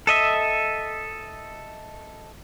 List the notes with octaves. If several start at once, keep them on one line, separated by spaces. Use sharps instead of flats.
A4 D#5 E5